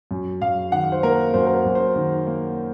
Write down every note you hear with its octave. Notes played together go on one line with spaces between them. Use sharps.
F#2
F#2 F5
D#3 F#5
C5
A#3 A#4
F#2 C5
A#4
C5
F#2
C5
D#3
A#3